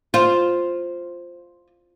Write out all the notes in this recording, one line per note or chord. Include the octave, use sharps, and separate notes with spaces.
F4 C5